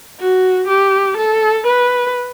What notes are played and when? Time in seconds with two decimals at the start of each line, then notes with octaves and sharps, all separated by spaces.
0.20 F#4
0.68 G4
1.17 A4
1.67 B4